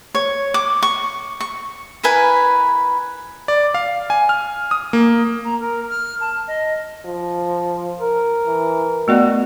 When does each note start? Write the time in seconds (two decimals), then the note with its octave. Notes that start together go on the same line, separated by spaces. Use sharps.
0.15 C#5
0.54 D6
0.82 C#6
1.40 C#6
2.03 E4 A#4 B4 G#5
3.48 D5
3.74 F5
4.10 G#5
4.29 F6
4.71 D#6
4.93 A#3
5.45 A#5
5.60 A#4
5.89 F6
6.21 A5
6.47 D#5
7.06 F3
8.00 A#4
8.47 E3
9.08 A3 B3 F#4 D5